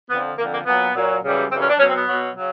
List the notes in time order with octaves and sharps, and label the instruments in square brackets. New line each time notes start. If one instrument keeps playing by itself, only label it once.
[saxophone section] F2 D3 F3 B3
F2 D3 F3 A#3
A#3
A#2 F#3 B3
A#2 F#3
F#2 C#3 E3 G3
F#2 C#3 E3 G3 C4
C#4
D4
B2 F#3 C#4
C4
B3
B2 F#3
C#3 F#3